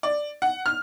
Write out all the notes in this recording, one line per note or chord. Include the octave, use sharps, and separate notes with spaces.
D5
F#5
F6